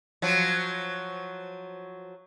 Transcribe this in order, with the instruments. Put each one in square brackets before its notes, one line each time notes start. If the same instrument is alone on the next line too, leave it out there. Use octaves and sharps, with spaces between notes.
[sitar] F3 F#3